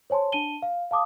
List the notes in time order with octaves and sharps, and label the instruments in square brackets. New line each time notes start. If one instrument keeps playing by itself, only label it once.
[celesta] C5 C#5 G#5 A5 C6
D4 A5 D#7 G7
F5
F5 A5 D6 D#6